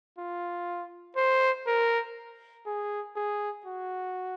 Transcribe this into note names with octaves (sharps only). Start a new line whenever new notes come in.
F4
C5
A#4
G#4
G#4
F#4